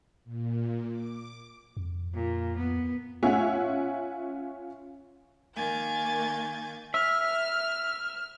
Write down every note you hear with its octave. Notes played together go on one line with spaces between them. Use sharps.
A#2
D6
F2
A#2
B3
C#4 F4 C#5 E5 F#5 G#5
D#3 A#3 G#5 G6 A6
E5 F6